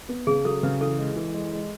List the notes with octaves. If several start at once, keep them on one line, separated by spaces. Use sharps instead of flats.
B3
C#3 G#4
F#3 A4
C#3 B4
E3 A4
G#3
E3
G#3
G#3